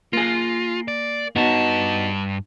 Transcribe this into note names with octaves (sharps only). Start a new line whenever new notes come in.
A#3 F4 G#4
D5
G2 B3 D#4 F#4 A5